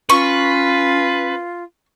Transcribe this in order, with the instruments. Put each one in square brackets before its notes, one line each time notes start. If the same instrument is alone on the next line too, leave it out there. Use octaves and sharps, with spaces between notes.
[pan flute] C#4 [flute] F4 [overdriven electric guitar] B4 [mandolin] C#6